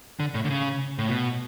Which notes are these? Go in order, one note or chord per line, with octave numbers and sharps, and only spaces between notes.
D3
A2
D3
C#3
A2
B2